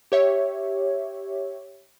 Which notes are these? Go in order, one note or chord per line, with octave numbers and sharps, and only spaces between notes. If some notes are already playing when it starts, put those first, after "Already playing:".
G4 C#5 E5